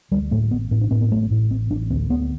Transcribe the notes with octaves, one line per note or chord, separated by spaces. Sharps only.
D2 G3
A2 A3
A1 B3
A2 C4
D4
A2 C4
B3
A1 A3
A2
A1 C4
A1 D4
D2 C4
D2 B3